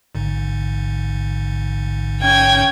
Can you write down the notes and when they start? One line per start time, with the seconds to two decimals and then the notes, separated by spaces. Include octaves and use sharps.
0.15 A1 G#2 D3
2.21 C#4 G5 G#6